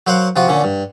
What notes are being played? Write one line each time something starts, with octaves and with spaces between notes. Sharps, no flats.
F#3 A#4 C5 F5 F#5
C3 F3 F4 F#4
A#2 D3 C#4
G2